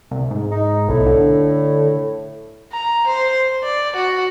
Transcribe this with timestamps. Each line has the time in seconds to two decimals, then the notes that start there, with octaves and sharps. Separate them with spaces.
0.11 C2
0.31 G#2
0.51 D#4
0.89 B1 A2
1.06 D3
2.72 A#5
3.07 C5
3.63 D5
3.96 F#4